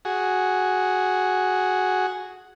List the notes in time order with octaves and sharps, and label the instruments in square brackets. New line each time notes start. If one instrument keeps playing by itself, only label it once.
[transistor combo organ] F#4 G#4